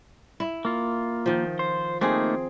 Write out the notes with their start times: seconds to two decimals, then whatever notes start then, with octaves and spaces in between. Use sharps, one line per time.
0.40 E4
0.65 A#3 F4
1.26 D#3 F3
1.59 C5
2.01 A3 A#3 C4 D#4 G#4